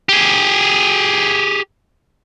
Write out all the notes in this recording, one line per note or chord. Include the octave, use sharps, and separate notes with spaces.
G4 G#4